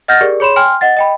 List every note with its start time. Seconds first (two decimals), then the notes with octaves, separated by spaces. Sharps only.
0.08 D#5 F#5 F6 G6 A6 A#6
0.21 G4 G#4 A#4 D5
0.40 G#4 C#5 B5 C6 E7
0.56 G5 G#5 C6 F6
0.81 D#5 F#5 A6
0.97 D#5 G5 B5